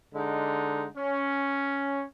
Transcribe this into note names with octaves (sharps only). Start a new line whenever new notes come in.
D3 G#3 D#4
C#4